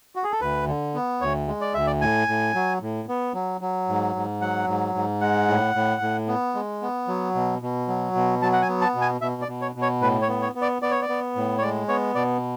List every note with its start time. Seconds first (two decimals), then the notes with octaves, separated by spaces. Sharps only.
0.16 F#4
0.24 G#4
0.32 A4
0.41 D2 B4
0.68 D3
0.94 B3
1.21 D2 C#5
1.48 G#3
1.61 D5
1.74 D2 E5
1.87 D5
2.01 A2 G#5
2.28 A2
2.54 F#3
2.81 A2
3.09 B3
3.34 F#3
3.61 F#3
3.89 G#2
4.15 G#2
4.41 F#3 F#5
4.68 G#2
4.95 G#2
5.21 G#3 F#5
5.48 A2
5.75 A2
6.02 A2
6.28 B3
6.55 G#3
6.82 B3
7.08 F#3
7.35 B2
7.62 B2
7.88 F#3
8.15 B2
8.42 F#3 A5
8.53 F#5
8.62 G#5
8.68 B3
8.81 A5
8.95 B2
9.01 G#5
9.21 B2 E5
9.42 D5
9.48 B2
9.61 C#5
9.75 B2
9.82 C#5
10.01 A2 B4
10.22 C#5
10.28 B3
10.42 C#5
10.55 B3
10.62 D5
10.82 B3 D5
10.91 C#5
11.02 D5
11.09 B3
11.36 A2
11.58 C#5
11.62 G#3 D5
11.88 B3 C#5
12.15 B2 D5